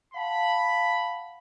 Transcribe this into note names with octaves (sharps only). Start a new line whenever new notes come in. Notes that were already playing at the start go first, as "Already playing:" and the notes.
F5 F#5 A5 B5